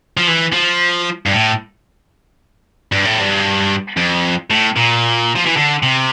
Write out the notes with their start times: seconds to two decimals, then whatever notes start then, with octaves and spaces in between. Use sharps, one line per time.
0.17 F3
0.27 E3
0.53 F3
1.26 G2
1.33 A2
2.92 G2
3.05 A2
3.20 G2
3.97 F2
4.51 A2
4.77 A#2
5.36 F3
5.46 E3
5.57 D3
5.83 C3